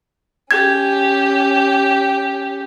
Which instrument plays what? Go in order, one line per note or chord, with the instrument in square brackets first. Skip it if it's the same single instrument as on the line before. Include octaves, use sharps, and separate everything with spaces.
[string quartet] C#4 G4 [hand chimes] G#6